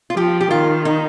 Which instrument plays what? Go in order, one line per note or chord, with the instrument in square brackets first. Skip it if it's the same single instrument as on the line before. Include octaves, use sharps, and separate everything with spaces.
[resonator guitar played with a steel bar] F4
[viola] F3 [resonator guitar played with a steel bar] G4
[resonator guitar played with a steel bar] G4
[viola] D#3 [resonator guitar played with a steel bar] F4
[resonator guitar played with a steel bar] D#4